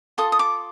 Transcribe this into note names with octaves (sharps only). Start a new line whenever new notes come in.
F4 A4 D#6
D#6
D6